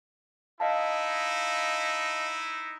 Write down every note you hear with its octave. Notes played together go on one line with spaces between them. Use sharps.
D#4 E4 D#5 F5 A5